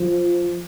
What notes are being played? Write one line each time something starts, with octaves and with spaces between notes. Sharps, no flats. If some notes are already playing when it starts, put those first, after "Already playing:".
Already playing: F3